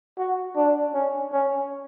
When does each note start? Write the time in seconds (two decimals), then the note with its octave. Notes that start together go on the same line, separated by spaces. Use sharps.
0.18 F#4
0.56 D4
0.94 C#4
1.32 C#4